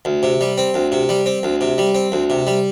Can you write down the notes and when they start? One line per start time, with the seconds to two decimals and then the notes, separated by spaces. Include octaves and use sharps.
0.05 D2
0.23 C3
0.41 G3
0.58 C4
0.74 D2
0.92 C3
1.09 G3
1.26 C4
1.43 D2
1.61 C3
1.78 G3
1.95 C4
2.12 D2
2.30 C3
2.47 G3